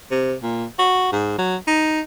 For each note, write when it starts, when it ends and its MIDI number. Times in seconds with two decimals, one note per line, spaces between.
0.11 0.34 48
0.43 0.65 46
0.79 1.11 66
1.12 1.35 44
1.38 1.56 54
1.67 2.01 63